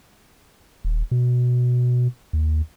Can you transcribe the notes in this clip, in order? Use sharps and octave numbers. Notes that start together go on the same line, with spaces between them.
D#1
B2
D#2